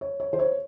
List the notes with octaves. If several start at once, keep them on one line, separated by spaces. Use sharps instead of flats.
C#5
C#5
C5
C#5